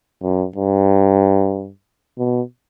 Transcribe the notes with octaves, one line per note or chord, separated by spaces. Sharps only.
F#2
G2
B2